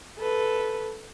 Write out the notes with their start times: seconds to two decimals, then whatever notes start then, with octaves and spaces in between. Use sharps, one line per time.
0.19 A4 B4